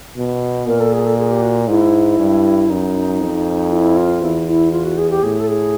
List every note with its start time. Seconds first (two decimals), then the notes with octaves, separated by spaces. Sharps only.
0.16 B2
0.67 A#2 A#4
0.80 A4
0.92 G#4
1.05 A4
1.17 G#4
1.31 G4
1.42 F#4
1.68 G#2 E4
2.19 G2
2.70 F#2 D#4
3.20 F2
3.71 F4
3.74 E4
3.97 F4
4.22 E2 E4
4.47 F4
4.51 E4
4.71 F4
4.85 F#4
4.98 G#4
5.10 G4
5.23 A2 G#4
5.40 A4
5.47 G#4